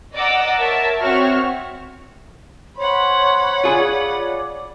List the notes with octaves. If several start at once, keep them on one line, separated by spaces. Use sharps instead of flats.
D5 D#5 F#5 A#5 D6 E6
A#4 C#5 E5 A5
C4 F#4 C#5 E5 C#6 F6
C5 C#5 F#5 B5
F4 G#4 D5